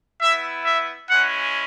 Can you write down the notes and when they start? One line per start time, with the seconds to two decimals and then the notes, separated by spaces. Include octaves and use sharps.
0.21 B3 E4 E5
0.65 E5
1.10 G#3 C#4 E4 F#5